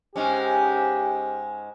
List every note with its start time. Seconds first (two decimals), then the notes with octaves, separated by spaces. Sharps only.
0.16 G#2 G#3 C#4 G4